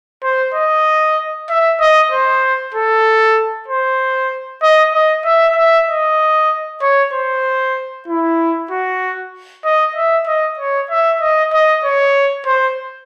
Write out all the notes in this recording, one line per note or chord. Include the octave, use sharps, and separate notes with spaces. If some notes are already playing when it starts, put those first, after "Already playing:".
C5
D#5
E5
D#5
C5
A4
C5
D#5
D#5
E5
E5
D#5
C#5
C5
E4
F#4
D#5
E5
D#5
C#5
E5
D#5
D#5
C#5
C5